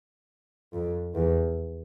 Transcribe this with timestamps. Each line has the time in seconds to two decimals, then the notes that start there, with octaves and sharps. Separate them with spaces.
0.73 F2
1.15 E2